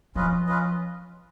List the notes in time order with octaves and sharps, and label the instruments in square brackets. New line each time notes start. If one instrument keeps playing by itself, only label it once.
[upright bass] F3 [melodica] C#4 F4 B4 D#5
[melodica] C#4 F4 B4 D#5